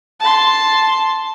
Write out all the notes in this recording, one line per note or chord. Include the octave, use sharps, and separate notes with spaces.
A5 C6